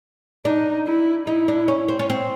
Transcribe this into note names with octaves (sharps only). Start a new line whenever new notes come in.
D4 D#4
E4
D#4 E4
D4
C#4
C4
C#4
C4